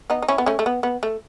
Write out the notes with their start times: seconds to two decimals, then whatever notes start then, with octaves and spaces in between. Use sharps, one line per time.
0.10 B3 D#4
0.22 D#4
0.28 C#4 E4
0.38 B3
0.46 A3 C#4
0.59 A3
0.66 B3
0.83 B3
1.03 A3